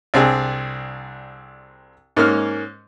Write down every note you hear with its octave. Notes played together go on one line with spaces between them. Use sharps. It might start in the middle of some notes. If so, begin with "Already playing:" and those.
C2 C4 D4 G#4
G#2 A#3 C#4 F6